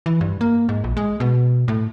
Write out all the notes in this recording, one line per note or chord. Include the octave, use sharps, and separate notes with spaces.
E3
G2
A#3
G#2
A#1
G#3
B2
A2